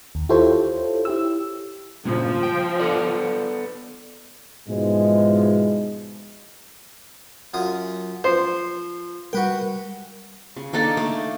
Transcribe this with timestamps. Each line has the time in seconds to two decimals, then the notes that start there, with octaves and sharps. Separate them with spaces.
0.15 D#2
0.29 E4 F4 G4 A4 C5 C#5
1.05 E4 G4 E6
2.05 G2 A#2 C#3 F3
2.43 G5
2.79 B3 A4 D5
4.68 G#2 B2 E3 F3 G#3
7.54 F#2 F4 D#6
8.24 F3 C5
9.33 G3 F#4 A#4 B4 G5
10.57 C#3
10.73 A#3 D4 D#4 A4
10.97 A3 A#3